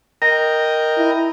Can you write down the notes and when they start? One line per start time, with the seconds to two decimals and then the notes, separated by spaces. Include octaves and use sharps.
0.22 A#4 D#5 G5 A#6
0.98 E4